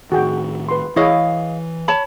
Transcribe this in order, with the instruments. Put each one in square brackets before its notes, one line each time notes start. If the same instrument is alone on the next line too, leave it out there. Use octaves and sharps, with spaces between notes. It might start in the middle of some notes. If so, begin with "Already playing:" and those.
[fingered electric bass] A2 D#3 [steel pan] F#4 G#4 G5
[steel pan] B4 C6
[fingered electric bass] E3 [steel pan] E4 C#5 [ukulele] G#4 D#5 F5
[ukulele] C#5 A5 B5